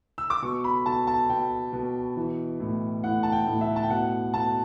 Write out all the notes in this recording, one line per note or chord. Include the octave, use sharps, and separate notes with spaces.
E6
D6
B2 C#6
B5
B2 A5
A5
B2 G5
B2
E3
A2
A2 F#5
A5
G5
A2
E5
A5
G5
B2 F#5
B2 A5